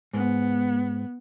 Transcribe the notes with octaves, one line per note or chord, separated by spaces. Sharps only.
G#2 B3